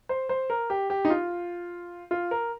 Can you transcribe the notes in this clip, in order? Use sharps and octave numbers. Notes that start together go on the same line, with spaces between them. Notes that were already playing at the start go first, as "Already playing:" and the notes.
C5
C5
A#4
G4
G4
D#4
F4
F4
A#4